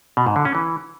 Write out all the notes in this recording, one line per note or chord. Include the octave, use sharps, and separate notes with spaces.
B2
G#2
D3
C#4
E3